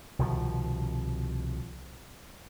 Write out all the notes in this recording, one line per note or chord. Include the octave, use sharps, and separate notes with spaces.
C2 B2 D#3 F3